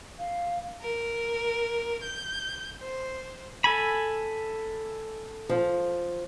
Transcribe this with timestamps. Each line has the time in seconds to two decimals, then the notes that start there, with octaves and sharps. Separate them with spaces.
0.19 F5
0.82 A#4
2.03 G6
2.81 C5
3.64 A4 G#5 B5
5.49 F3